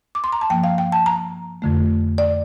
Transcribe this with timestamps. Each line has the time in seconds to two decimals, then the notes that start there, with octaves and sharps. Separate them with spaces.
0.15 D6
0.24 C6
0.33 A#5
0.41 A5
0.50 G2 F3 A#3 G5
0.64 F5
0.78 G5
0.92 A5
1.06 A#5
1.62 F2 D3 A3
2.18 D5